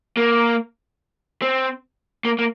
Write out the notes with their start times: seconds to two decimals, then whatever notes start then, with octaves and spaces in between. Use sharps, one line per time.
0.17 A#3
1.42 C4
2.25 A#3
2.39 A#3